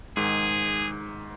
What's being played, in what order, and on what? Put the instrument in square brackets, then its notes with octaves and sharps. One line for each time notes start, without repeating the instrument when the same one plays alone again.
[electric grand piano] G#2 D#3 [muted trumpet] G#4